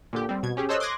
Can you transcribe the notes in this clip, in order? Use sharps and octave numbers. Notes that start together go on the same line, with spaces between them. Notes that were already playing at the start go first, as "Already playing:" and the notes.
A#2 D3 G4
G3 C4
B2 G#6
C#4 G4 G#4
A4 C5 C#5 D#5 E6 F#6
C6 D6 D#6 F#6 G#6 A#6